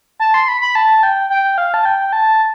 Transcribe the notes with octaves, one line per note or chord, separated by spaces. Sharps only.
A5
C6
B5
B5
A5
G5
G5
F5
A5
G5
A5